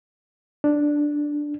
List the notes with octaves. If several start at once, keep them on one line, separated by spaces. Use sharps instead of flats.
D4